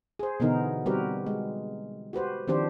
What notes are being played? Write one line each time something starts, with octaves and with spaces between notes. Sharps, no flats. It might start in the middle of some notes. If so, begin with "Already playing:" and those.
G#4 C5
B2 D3 E3 B3 D#4 A#4
G3 C4 F#4 G4 A#4 B4
G#3
F#4 G4 B4 C5
D#3 F3 C4 D4 G4 C5